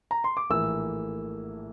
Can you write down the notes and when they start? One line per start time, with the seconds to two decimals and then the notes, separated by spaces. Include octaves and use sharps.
0.11 A#5
0.24 C6
0.37 D6
0.50 A#1 A2 E3 A#3 E6